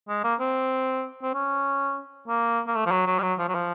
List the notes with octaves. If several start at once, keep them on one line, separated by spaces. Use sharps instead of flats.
G#3
A#3
C4
C4
C#4
A#3
A#3
A3
F3
F#3
F#3
G3
F#3
F3
F#3
F3